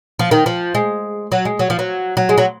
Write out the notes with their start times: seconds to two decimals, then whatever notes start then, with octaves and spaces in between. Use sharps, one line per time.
0.19 F3
0.31 D#3
0.46 F3
0.75 G#3
1.32 F#3
1.45 G#3
1.59 F#3
1.70 F3
1.79 F#3
2.17 F#3
2.29 G#3
2.38 F#3